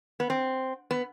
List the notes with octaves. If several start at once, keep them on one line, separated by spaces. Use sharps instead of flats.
B3
C4
B3